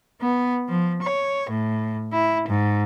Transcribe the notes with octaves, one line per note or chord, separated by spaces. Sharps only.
B3
F3
C#5
A2
E4
G#2